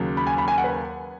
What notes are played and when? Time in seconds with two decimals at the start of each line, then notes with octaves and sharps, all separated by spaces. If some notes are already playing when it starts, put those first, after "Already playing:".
Already playing: D#2 C#3 F#3
0.17 B5
0.27 G#5
0.38 B5
0.48 G#5
0.58 F#5
0.64 B4